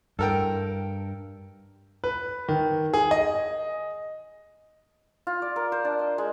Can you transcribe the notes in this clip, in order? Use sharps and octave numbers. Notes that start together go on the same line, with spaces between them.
G2 A4 A#4 G5
B4
D#3
G#4
D#5
F4
D5
A#4
C5
D4
D#5
G#3